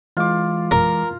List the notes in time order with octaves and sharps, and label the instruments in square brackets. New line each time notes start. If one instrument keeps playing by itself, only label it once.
[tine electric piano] E3 G#3 D6 [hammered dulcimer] F4
[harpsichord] A#4